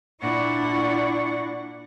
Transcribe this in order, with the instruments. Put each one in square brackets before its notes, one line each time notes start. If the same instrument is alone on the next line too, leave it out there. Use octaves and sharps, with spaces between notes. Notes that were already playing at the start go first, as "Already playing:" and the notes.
[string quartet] A#2 D4 E4 D5 F#5 C#6